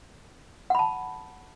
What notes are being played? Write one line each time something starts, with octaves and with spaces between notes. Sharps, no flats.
F#5 A5 B5